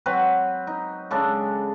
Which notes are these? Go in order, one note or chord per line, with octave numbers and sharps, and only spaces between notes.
F#3 C4 B4
D#4
C#3 G#3 D4 A4